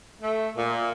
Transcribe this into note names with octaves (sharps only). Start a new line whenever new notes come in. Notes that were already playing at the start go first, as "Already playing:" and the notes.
A3
A#2